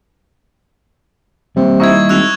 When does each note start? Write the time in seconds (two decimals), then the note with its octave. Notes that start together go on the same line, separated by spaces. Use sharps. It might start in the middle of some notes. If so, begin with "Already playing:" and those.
1.57 C3 G3 A#3
1.80 D#4 E4 C#6 G#6
2.09 G#1 E6 F#6 F7